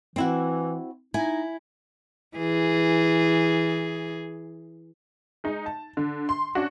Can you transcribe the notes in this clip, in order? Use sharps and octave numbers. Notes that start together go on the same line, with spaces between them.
E3 C4 E4 F#4
D#4 E4 G#5
E3 G#4
G#3 D#4
A5
D3
C6
C#4 D4 F#4